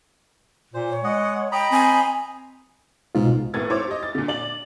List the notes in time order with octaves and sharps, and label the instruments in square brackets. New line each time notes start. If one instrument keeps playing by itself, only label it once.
[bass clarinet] A#2 [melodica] C5
[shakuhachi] C#5
[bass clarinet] G#3 [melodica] D#5 F#5
[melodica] D#5 A#5 B5 [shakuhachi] G5
[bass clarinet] C4 [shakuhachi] G#5
[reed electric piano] C2 B2 F4 [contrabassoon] G#2
[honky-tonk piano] G#1 A2 B3 E4 G#6 A6
E4 C5 C#5 D6
G4 D#5
A6
A#2 D3
D5 F#7